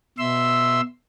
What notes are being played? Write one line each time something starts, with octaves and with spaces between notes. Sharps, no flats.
B2 E5 C6 E6